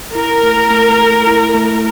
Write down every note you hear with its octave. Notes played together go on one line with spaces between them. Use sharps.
E4 A#4
A3
A3
A4
E4
A3